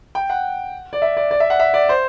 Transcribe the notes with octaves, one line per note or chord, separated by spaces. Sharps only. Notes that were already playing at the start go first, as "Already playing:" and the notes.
G5
F#5
D5
E5
D5
D5
E5
F#5
E5
D5
C5